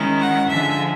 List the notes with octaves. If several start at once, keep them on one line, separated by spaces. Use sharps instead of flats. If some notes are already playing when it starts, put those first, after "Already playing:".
Already playing: D#3 G#3 C#4 E4
F#5
D3 F3 G#3 E5